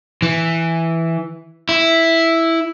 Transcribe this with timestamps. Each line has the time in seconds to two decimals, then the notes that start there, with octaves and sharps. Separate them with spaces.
0.22 E3
1.69 E4